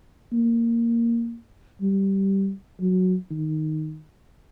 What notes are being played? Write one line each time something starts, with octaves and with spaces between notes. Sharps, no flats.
A#3
G3
F#3
D#3